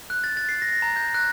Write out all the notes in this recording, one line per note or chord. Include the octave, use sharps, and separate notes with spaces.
F#6
A6
A6
C7
A#6
A#5
G6
F#6